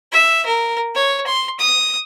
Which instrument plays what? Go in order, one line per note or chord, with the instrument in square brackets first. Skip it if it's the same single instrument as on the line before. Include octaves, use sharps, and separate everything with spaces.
[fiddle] E5
A#4
C#5
C6
D#6